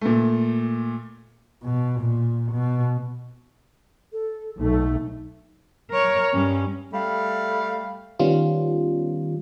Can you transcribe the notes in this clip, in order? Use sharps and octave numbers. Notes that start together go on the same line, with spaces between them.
A#2 A3
B2
A#2
B2
A4
B1 A3 D#4
A#4 C#5
G2 C#4
G3 A3 F5
D#3 G3 B3 C#4 F4